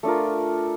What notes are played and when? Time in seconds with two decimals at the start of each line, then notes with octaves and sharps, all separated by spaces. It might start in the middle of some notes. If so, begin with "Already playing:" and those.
0.03 A3 D4 F4 A#4